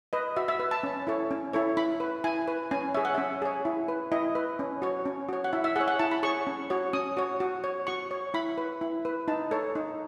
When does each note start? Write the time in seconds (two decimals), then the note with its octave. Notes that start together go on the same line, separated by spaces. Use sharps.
0.13 B4 D#5
0.37 F#4 E5
0.48 E5
0.59 B4
0.71 A5
0.83 C#4
1.07 E4 A4 C#5
1.31 C#4
1.53 E4 A4 C#5
1.77 E4 B5
2.00 B4
2.24 E4 G#5
2.48 B4
2.71 C#4 G#5
2.94 G#4 C#5 E5
3.05 F#5
3.15 C#4 E5
3.42 G#4 C#5
3.65 E4
3.88 B4
4.12 E4 D#5
4.35 B4
4.59 C#4
4.82 F#4 C#5
5.05 C#4
5.29 F#4 C#5
5.44 F#5
5.53 E4 E5
5.64 E5
5.76 G#4 C#5 F#5
5.88 F#5
5.99 E4 A5
6.11 B5
6.23 G#4 C#5 C#6
6.47 C#4
6.70 F#4 C#5
6.93 C#4 D#6
7.17 F#4 C#5
7.40 F#4
7.64 C#5
7.87 F#4 C#6
8.11 C#5
8.34 E4 B5
8.58 B4
8.81 E4
9.05 B4
9.28 D#4 A5
9.51 A4 C#5
9.75 D#4